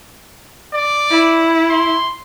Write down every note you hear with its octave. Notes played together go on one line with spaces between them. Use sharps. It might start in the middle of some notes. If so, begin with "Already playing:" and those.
D5
E4
C6